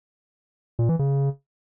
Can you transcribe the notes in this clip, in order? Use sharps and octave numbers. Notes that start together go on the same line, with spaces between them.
A#2
E3
C#3